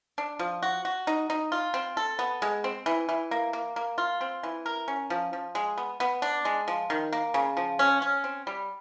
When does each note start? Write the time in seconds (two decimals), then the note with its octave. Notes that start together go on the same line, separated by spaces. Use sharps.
0.18 D4
0.39 F3
0.62 F#4
0.85 F#4
1.07 D#4
1.30 D#4
1.52 F4
1.74 C4
1.97 A4
2.19 B3
2.42 G#3
2.64 C4
2.86 E3
3.09 E3
3.31 A#3
3.53 A#3
3.76 A#3
3.98 F4
4.21 C4
4.43 E3
4.66 A#4
4.88 C#4
5.10 F3
5.33 F3
5.55 G#3
5.78 B3
6.00 B3
6.22 D4
6.45 G#3
6.68 F3
6.90 D#3
7.13 A#3
7.34 C#3
7.57 F3
7.79 C#4
8.02 C#4
8.24 C4
8.47 G3